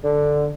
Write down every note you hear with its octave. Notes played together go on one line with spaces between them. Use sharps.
D3